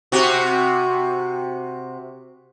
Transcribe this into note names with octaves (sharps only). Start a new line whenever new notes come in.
C3 F#4